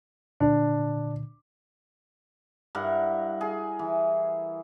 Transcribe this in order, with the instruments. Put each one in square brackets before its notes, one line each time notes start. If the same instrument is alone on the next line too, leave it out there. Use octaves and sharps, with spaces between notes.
[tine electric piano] A#2 D3 [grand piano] D4
[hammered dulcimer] G2 E4 A#4 F#5
G#4
E3